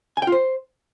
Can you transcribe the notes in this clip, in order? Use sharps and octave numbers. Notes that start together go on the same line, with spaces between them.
G#5
G5
F4
C5